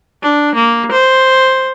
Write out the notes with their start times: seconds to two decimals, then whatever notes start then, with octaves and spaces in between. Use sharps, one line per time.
0.22 D4
0.55 A#3
0.92 C5